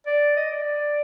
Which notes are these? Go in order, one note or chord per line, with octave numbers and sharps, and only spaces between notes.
D5
D#5
D5